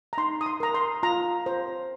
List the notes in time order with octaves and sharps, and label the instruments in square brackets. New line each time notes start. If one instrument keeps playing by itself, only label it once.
[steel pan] A#5
D#4 C6
D#6
C6
A#4 A#5
C6
F4 A#5
C5